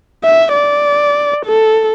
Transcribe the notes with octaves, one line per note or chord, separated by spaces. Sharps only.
E5
D5
A4